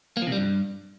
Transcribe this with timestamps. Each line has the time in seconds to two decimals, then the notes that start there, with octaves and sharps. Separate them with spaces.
0.17 A#3
0.22 F3
0.27 C3
0.32 G3
0.37 G2